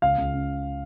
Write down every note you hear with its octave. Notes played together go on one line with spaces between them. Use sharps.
C#2 F5
C#2
C#3